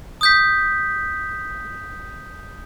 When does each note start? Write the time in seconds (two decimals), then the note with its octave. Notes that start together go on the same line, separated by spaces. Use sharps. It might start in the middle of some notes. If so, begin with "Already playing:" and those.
0.21 D#6 G6 B6